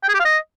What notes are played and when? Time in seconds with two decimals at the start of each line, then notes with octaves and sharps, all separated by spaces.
0.03 G5
0.09 G#4
0.14 G4
0.20 F5
0.25 D#5